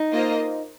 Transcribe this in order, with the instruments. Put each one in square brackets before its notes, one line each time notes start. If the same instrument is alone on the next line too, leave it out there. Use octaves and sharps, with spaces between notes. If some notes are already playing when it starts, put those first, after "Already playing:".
Already playing: [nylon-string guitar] D#4
[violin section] A#3 F4 C5 D#5